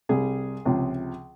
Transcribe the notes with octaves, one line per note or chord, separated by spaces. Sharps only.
C2 C3 G3 G#4
C#2 C3 F3